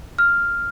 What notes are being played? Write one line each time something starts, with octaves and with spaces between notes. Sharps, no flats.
F6